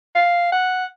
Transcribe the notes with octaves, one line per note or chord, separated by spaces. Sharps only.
F5
F#5